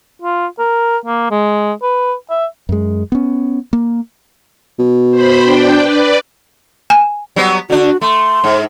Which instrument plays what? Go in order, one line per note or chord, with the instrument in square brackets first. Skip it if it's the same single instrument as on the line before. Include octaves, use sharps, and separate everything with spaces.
[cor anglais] F4
A#4
A#3
G#3
B4
E5
[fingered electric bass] F#2 G#3
B3 C#4
A#3
[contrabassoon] B2
[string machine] C5 B5
D4 G5
B4 D5
[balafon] G#5
[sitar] F#3 G3 B3
[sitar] D3 D4 [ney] F#4
[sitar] A3 [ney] C6
[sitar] G#2